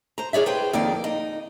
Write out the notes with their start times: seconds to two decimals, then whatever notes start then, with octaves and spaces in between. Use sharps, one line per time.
0.18 C5 A#5
0.33 E4 G#4 C#5 D5 E5
0.46 B4 C5 G5
0.73 F2 D#3 A#3 D5
1.04 D#4